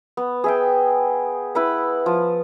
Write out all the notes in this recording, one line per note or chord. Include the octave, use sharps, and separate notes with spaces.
B3
G#4 E5 G5
E4 B4 F#5 B5
F3